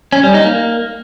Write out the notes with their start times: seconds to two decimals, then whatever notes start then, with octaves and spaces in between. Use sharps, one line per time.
0.13 C#4
0.23 G3
0.34 D#4
0.45 A#3